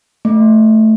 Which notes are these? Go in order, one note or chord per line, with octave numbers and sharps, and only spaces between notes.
A3